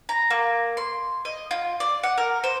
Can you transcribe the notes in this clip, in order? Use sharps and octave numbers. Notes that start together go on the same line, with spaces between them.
A#5
A#3
C6
D#5
F4
D5
F#5
A#4
C5